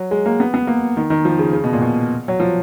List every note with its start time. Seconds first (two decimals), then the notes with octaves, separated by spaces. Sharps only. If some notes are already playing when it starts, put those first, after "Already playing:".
Already playing: F#3
0.11 G#3
0.26 A#3
0.40 B3
0.54 B3
0.67 A#3
0.97 D#3
1.10 D#3
1.25 F3
1.39 C#3
1.53 C#3
1.64 B2
1.73 A#2
1.82 B2
2.28 F#3
2.40 F3